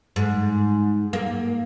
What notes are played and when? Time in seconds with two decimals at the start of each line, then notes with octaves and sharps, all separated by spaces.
0.16 G#2
1.13 A#3